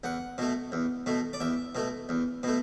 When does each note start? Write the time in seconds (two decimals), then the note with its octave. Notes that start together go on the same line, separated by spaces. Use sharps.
0.04 E2 F#5
0.38 B2 A3
0.72 E2
1.06 B2 A3
1.33 D5
1.40 E2 E5
1.75 B2 A3
2.09 E2
2.43 B2 A3